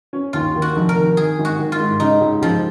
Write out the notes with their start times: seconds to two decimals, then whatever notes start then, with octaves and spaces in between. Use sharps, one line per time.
0.13 C#4
0.33 D#2 F4
0.55 D#3
0.62 F#4
0.76 F1
0.89 A#4
0.96 D#3
1.17 D#3 G#4
1.38 G#1
1.45 F#4
1.59 D#3
1.72 F4
1.80 G#2
2.00 C#3 D#4
2.21 C#2
2.41 C#2 F3